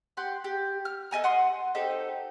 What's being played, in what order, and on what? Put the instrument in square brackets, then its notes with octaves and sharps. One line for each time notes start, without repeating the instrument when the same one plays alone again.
[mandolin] G4 F#5 C6
G4
F6
A4 D#5 G#5 A#5
F#5 C6 D#6
C4 D#4 G4 A4